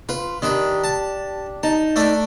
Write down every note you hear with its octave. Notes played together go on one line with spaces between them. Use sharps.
F4 B4
D#3 D4 G4 B4
A5
D#4 A5
A3 D4 A4